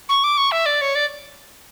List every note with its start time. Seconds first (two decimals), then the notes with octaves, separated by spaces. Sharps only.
0.09 C#6
0.24 D6
0.38 C#6
0.52 E5
0.66 D5
0.81 C#5
0.95 D5